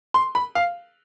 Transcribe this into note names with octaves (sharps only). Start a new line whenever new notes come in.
C6
B5
F5